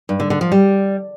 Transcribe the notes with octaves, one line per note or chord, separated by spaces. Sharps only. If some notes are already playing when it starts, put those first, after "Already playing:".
G2
D3
D3
F3
G3